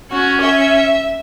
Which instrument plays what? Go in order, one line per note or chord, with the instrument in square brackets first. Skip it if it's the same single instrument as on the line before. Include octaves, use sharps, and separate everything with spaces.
[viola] C#4 [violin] F#4
[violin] E5